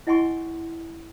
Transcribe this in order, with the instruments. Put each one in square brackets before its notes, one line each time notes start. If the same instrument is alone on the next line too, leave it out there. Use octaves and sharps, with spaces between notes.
[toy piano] E4 D#5 F#5 G#5 C6 C#6